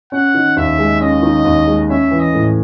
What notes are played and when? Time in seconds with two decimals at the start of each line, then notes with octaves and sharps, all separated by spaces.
0.12 C#4 F#5
0.34 D#3
0.57 D#2 E5
0.79 G#3
1.01 C#4 D#5
1.23 D#3
1.45 D#2
1.67 G#3
1.90 C#4 E5
2.11 E3
2.20 D#5
2.34 A2